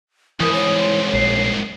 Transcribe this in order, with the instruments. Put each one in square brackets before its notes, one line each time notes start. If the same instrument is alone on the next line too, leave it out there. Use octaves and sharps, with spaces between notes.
[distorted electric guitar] C2 G#2 [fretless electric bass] E3 [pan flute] A#4 [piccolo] D#6
[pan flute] C#5
[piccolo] C6
[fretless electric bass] A#1 [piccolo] C7